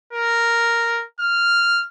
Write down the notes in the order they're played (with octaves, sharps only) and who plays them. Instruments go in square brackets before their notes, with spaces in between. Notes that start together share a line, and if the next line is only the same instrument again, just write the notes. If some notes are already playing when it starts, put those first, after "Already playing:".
[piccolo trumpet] A#4
F6